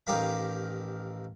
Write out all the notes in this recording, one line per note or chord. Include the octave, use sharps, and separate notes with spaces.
A1 D#3 G4 A#4 F5 B5